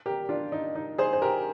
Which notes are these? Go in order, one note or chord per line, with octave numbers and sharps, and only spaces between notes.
G4 A#4
D4 F4
D#4
D#4
G#4 C5
C5
G4 A#4